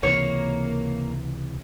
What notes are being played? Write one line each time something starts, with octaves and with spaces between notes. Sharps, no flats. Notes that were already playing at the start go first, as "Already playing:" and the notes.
C#2 C3 E3 A#3 C#5